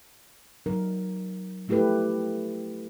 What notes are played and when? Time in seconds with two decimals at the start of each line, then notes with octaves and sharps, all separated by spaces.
0.66 F#3 D#4 A#4
1.68 F3 A3 E4 G4 A4 B4